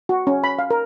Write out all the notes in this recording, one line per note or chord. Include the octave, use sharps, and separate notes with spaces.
F#4
C#4
B5
F5
A#4